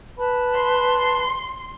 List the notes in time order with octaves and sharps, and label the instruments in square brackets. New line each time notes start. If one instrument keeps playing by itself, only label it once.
[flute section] B4 A5 B5
[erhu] C6